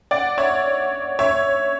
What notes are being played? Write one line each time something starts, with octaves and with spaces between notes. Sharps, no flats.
D5 F#5
C#5 E5
C#5 E5